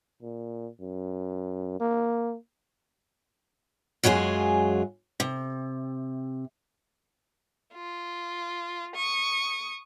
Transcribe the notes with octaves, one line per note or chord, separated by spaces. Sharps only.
A#2
F#2
A#3
F#2 F#3 G#3 F4 G#4
C3
F4
C#6 D#6